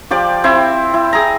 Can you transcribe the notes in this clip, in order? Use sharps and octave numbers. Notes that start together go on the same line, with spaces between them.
F3 G4 D5 D6
C4 E4
E4
G#4 A#5